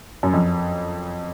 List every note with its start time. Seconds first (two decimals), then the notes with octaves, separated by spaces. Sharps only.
0.23 F#2
0.33 F2